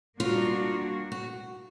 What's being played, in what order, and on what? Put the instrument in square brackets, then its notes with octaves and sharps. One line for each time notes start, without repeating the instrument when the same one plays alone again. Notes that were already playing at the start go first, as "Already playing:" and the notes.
[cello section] G3 A#3 D4 F#4 [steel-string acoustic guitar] F4
[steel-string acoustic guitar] F#4